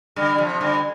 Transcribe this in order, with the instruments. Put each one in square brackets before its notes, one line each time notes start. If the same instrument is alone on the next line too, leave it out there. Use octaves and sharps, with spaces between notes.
[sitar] D3 G3
C3 F3
D3 G3